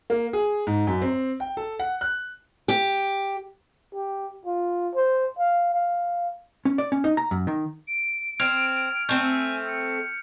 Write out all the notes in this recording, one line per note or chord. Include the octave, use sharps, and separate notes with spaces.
A#3
G#4
G#2
F#2
C4
G5
A4
F#5
F#6
G4
G4
F4
C5
F5
F5
C#4
D5
C#4
D#4
A#5
F#2
D#3
D7
C4 F6 G#6 F7
A3 C4 G#5 G6
C#7